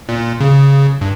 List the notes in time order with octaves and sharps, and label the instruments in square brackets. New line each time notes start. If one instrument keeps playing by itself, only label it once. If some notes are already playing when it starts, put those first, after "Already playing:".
[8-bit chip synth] A#2
C#3
G2